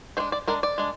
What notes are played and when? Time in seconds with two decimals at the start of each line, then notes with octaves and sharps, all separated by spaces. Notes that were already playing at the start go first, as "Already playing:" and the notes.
0.17 G#3 C5
0.20 D4
0.32 D5
0.48 G#3 D4 A#4
0.63 D5
0.78 G#3 D4